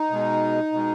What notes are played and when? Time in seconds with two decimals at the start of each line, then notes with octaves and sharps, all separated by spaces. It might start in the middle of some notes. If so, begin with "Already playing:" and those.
Already playing: D#4
0.10 B2 G#3
0.72 B2 G#3